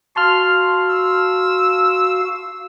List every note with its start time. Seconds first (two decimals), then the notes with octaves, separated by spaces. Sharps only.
0.16 F#4 F5 A5 C6 F6
0.89 E6